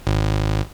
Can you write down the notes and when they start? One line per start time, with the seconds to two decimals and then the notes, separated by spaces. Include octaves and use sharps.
0.07 G#1